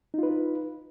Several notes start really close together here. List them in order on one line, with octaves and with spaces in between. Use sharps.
D#4 F4 B4